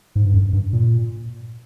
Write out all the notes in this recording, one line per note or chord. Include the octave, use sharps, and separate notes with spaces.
G#2
G2
F#2
G2
A#2